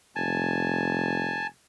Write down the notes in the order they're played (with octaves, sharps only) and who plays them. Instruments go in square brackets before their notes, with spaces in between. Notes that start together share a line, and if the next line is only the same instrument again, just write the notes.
[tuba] F1 [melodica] G#5 A5